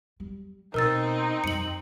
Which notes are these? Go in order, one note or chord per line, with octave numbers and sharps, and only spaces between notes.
G3
B2 C4 D#4 A#4 E6 A6
F2 G3 C#7 F#7